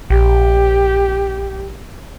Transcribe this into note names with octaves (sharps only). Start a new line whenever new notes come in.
A#1 G4